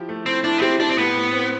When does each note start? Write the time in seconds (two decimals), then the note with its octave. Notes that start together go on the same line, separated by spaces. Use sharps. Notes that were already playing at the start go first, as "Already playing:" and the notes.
Already playing: F3 E4 G4
0.09 A3
0.26 C4 E4
0.44 D4 E4
0.58 B3
0.62 C4 G4
0.79 D4 G4
0.89 C4
0.98 A2 B3
1.15 A2
1.33 C4